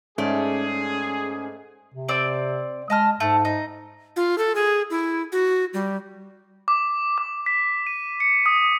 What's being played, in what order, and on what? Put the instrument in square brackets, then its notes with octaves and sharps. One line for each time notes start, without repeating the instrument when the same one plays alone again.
[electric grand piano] G#2 [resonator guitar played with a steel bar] A3 D5 [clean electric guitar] C#4 [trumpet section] G#4
[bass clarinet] C3
[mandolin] C4 D5 E6
[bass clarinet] G#3 [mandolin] D#5 A5 F6
[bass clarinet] G#2 [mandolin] A3
[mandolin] D#4
[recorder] F4
A4
G#4
E4
F#4
G3
[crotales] D6
D6
B6
D#7
C#7
D#6